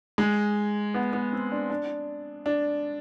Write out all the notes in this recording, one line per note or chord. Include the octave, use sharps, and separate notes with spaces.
G#3
B3
B3
C4
D4
D4
D4